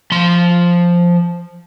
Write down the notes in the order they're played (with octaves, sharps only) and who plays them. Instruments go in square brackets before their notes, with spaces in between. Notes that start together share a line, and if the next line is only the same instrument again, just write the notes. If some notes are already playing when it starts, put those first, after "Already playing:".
[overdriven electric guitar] F3 C6